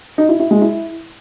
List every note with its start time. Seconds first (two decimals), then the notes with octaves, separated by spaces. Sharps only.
0.18 D#4
0.29 E4
0.40 E4
0.51 G#3
0.62 E4